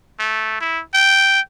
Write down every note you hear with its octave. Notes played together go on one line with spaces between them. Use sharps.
A3
E4
G5